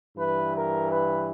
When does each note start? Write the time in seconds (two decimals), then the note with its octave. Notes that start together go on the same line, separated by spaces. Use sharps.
0.14 G2 E3 B4
0.52 A#4
0.89 B4